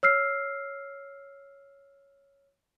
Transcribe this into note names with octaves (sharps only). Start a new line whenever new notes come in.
C#5 E6 F6 C7